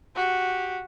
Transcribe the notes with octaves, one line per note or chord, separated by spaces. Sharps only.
F#4 G4